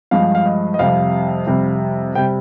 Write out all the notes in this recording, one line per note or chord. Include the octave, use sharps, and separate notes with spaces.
G2 F3 G#3 F5
F5
D#5
D#5
F2 C3 G3 F5
F2 C3 G3
C3 G3 G5